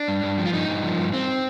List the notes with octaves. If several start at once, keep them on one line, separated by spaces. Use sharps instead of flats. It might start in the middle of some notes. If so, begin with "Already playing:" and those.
Already playing: D4
G2
G2
F3
F4
G2 D#4
G2
F3
G2
G2 C4